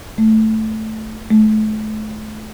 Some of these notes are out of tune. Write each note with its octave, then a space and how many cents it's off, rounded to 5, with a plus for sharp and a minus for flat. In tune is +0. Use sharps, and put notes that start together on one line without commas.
A3 -5
A3 -35